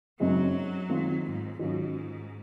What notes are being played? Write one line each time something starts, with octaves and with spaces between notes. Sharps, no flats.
F#2 C#3 F#3 G#3 C4 D#4
D#3 G#3 C4 F4
G#2
G#2 D#3 F#3 C#4 F4